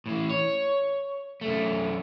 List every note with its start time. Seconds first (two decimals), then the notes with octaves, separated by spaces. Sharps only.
0.06 A2 E3
0.30 C#5
1.41 F#2 A3